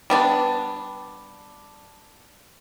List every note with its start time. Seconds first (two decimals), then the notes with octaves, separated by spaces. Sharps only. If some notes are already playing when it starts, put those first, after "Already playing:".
0.10 G3 B3 D4